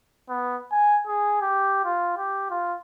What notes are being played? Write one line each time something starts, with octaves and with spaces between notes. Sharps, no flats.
B3
G#5
G#4
G4
F4
G4
F4